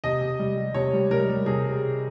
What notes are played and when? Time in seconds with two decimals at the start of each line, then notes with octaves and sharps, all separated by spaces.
0.04 C3 D#5
0.21 C3
0.39 G3
0.57 G3
0.74 C3 C#5
0.93 G3
1.10 G3 A#4
1.29 G3
1.46 C3 G#4